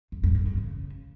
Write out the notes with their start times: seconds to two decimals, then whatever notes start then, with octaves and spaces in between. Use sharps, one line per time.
0.12 E2
0.24 F#2
0.35 G#2
0.46 G#2
0.58 C#3